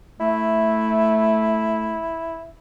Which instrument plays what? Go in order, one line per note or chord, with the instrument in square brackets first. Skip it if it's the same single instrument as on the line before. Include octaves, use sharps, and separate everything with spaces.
[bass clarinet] A3 [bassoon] E4